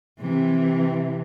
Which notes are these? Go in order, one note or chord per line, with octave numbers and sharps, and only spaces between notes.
C3 E3